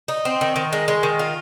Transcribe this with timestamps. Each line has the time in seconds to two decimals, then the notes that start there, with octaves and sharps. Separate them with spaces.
0.08 D#4
0.25 C4
0.41 D#3
0.56 D#3
0.73 G#3
0.88 G#3
1.03 D#3
1.19 F4